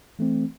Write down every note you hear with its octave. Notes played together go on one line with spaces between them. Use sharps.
E3 A3 C4